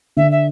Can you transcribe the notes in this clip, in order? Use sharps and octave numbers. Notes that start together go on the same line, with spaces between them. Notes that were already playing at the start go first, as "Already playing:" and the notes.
D3 E5
E5